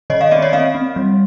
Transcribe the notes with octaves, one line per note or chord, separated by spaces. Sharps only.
D#3 C#5 D#5
D#5 F5
C4 D5 E5
C#5 D#5
C4 D#5 F5
C4
G3